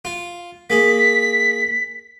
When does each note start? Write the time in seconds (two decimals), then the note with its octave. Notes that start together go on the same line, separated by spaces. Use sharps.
0.05 F4
0.70 A#3 G#4 B6